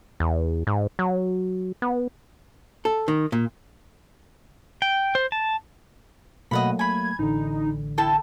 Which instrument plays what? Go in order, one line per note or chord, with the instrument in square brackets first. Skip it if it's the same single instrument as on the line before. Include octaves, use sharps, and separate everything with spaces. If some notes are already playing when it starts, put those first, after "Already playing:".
[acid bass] E2
G#2
F#3
B3
[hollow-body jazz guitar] A4
D#3
A#2
[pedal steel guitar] G5
C5
A5
[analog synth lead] B2 [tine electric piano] F#3 A3 A#3 [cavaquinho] D#5 F#5 B5
[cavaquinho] G#5 B5 [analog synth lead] G#6
[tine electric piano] A1 D3 [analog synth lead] D#4
[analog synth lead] E4 [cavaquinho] A4 G5 A5